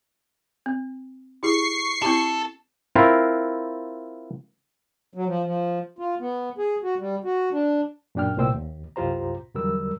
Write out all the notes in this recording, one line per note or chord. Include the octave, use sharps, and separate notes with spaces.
C4
E4 G4 G#4 C#6 C7
C4 E4 G4 A4
C4 E4 F4 A#4
F#3
F3
F3
F4
B3
G#4
F#4
G3
F#4
D4
F#2 A#2 D4 G5 F6
C2 A#2 A3 C5 G5 E6
D#2
C2 F#2 F4 G4 C5 A#5
E2 D3 F#3 G3 A#4 E6